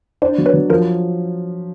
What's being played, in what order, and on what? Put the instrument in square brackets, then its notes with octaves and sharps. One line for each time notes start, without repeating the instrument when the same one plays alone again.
[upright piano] D4 [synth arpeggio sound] C5 D5
[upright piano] F#3
[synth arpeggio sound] B4 C#5
[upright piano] F#3
[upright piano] F3 [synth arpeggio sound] A#4 C5